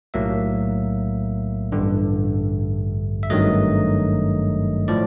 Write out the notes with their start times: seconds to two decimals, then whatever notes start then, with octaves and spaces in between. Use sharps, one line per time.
0.14 B1 A2 F#3 A#3 E5
1.72 A1 G2 D3
3.23 E5
3.30 G#1 G2 D#3 F#3 A3 D#5
4.88 A2 F3 D5